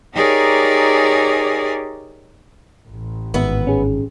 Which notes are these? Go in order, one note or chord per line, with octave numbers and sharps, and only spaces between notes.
D#4 G4 G#4 A#4 C#5 D5
A1
G#1 B3 B4 E5
C#4 G#4